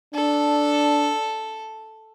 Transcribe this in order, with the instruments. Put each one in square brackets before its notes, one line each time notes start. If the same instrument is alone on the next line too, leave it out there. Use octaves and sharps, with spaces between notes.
[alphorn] D4 [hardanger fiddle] A4